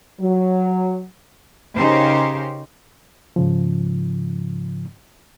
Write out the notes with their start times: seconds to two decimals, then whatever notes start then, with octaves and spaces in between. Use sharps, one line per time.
0.20 F#3
1.76 C#3 C#4 D#4 G4 A#4 C5
3.36 G#2 C#3 F3